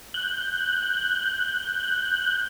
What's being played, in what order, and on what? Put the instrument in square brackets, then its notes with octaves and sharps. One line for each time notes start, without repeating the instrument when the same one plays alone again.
[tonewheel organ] F#6 G6